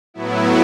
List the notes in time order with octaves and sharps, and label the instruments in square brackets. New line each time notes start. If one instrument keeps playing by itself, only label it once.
[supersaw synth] A2 F#3 B3 E4